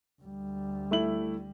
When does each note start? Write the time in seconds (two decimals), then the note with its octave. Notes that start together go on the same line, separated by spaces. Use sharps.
0.22 D2 G3
0.91 A3 E4 F#7